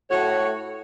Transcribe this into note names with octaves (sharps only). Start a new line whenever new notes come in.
A2 F#4 C#5